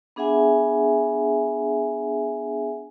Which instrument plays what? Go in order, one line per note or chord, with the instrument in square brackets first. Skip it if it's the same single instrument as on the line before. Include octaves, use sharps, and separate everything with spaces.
[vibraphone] B3 D4 G#4 E5 F#5 G#5